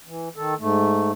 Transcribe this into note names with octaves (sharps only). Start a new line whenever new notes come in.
E3
D#3 A4
G#2 A3